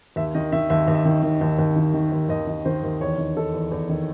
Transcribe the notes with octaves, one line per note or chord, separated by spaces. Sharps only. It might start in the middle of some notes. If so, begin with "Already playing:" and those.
D#2 E5
D#3 D#5
D#3 E5
D#2 E5
D#2
E5
D#3
D#3
D#2
D#2
D#3
D#3
D#2
D#2 D#5
D#3
D#3 C5
D#2
E2 C#5
D#3
D#3 A4
E2
E2
D#3